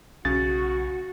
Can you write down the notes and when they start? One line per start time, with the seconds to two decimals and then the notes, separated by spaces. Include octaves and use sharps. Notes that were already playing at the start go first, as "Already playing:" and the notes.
0.25 B1 C#3 F#4 A6